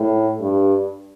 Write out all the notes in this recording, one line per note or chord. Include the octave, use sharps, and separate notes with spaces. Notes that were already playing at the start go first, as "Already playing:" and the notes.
Already playing: A2
G2